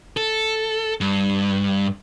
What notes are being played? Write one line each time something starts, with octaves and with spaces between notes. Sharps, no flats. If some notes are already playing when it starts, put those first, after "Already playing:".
A4
G2